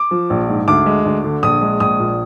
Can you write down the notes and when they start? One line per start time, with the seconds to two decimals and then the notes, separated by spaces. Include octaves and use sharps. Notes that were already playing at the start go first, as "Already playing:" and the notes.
Already playing: D6
0.11 F3
0.30 A#1
0.49 G#2
0.68 D2 D6
0.86 G#3
1.05 D2
1.24 D3
1.43 A#1 D#6
1.61 G#3
1.80 A#1 D#6
1.99 A#2